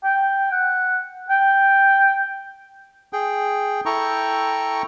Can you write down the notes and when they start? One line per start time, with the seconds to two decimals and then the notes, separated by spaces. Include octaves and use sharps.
0.04 G5
0.52 F#5
1.30 G5
3.13 G#4 G5
3.86 E4 A4 G5 A#5 C#6